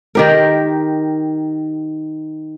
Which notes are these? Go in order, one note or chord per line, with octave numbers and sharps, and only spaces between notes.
D#3 G4 A#4